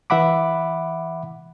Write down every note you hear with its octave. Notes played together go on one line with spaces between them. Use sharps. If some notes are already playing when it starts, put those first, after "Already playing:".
E3 E5 F#5 B5 D6